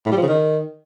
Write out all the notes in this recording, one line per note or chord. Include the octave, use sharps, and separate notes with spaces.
A2
G3
F3
C#3
D#3